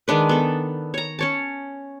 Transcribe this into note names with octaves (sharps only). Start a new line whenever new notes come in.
D#3 G#3 D4 B4
B3 A4
C#5 A#5
C#4 C#5 A5